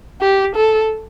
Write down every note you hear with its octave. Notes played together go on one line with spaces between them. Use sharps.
G4
A4